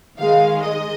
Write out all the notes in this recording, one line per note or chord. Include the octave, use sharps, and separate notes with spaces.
D#3 G#3 F5
D#5